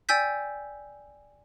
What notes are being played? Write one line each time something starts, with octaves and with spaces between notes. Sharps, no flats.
D5 G5 G#5 E6 G6 B6